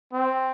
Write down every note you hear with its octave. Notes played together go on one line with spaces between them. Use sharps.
C4